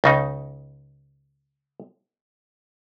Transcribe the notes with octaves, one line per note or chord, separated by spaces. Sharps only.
C#2 C#3 D#4